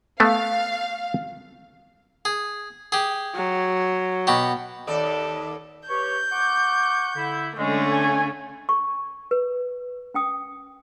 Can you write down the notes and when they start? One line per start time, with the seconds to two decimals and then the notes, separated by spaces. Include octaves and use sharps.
0.20 A3 B3 F5
2.25 G#4
2.92 G4 G#4
3.35 F#3
4.27 B2 F#4 G4
4.87 D#2 A4 D5
5.89 G4 B4 C#5 G6
6.32 F#5 C#6 D6
7.16 D3 E4
7.57 D3 G#3 A3 C#4
7.91 G#5
8.69 C#6
9.31 B4
10.14 C#4 G5 D#6